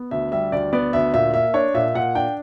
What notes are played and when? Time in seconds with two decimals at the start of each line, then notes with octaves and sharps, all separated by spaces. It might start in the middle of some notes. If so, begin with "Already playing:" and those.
Already playing: B3
0.11 D2 E5
0.31 G3 E5
0.52 D2 D5
0.73 B3 D5
0.93 D2 E5
1.13 A#2 E5
1.34 A#3 E5
1.54 D4 C#5
1.74 A#2 E5
1.95 A#2 F#5
2.15 D4 G5